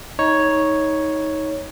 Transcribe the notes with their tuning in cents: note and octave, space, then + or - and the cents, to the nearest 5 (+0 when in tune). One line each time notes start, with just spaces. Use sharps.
D#4 +20 C#5 +0